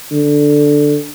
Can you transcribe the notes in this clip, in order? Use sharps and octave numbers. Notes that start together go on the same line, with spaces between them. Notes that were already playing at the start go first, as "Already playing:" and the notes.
D3